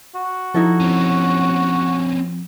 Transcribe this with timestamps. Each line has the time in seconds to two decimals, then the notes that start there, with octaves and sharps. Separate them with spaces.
0.15 F#4
0.54 F3 D#4 E4 A4
0.80 C4 C#4